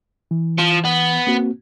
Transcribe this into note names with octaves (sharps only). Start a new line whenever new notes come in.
E3
F3
B3
A#3 C4 F#4